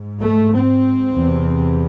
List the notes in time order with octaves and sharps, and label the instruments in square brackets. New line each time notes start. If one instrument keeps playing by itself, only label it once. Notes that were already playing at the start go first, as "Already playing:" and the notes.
Already playing: [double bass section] G#2
A3
C4
E2 C3